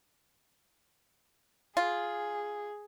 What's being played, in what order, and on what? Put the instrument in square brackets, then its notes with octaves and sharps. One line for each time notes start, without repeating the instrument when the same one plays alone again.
[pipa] F4 [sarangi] G#4